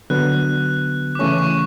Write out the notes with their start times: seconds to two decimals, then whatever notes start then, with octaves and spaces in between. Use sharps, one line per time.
0.10 D3 F#3 B3 F#6
1.15 D6
1.19 C#3 E3 A3 C#4 C#6
1.38 C#6